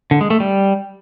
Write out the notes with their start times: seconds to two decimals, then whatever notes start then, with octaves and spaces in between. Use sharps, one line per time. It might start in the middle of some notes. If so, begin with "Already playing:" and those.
0.11 D3
0.21 G#3
0.30 A3
0.40 G3